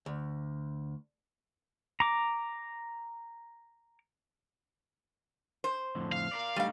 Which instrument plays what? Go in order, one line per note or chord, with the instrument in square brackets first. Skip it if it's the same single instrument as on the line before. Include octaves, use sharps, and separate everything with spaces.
[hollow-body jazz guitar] D2
[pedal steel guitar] A#5 D6
[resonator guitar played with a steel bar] C5
[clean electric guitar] F2 A2 D3
[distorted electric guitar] F5
[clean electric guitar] A#4 B4 D5
[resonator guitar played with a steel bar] G3 F5 [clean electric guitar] A3 D4 D#4